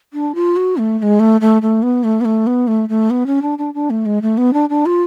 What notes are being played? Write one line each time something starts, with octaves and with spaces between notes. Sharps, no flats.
D4
F4
F#4
A3
A3
G#3
A3
A3
A3
B3
A3
B3
A3
B3
A3
A3
B3
C#4
D4
D4
D4
A3
G#3
A3
B3
D4
D4
F4